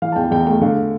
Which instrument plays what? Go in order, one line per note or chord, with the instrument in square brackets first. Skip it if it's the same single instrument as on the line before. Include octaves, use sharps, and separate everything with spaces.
[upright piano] E3 F5
A5
E2 G5
E2 G5
A3 G5
D3 F5